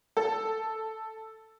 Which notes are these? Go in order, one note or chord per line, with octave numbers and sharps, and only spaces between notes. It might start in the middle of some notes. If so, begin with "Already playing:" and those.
A4